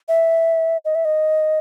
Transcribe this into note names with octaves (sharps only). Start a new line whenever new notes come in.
E5
D#5
E5
D#5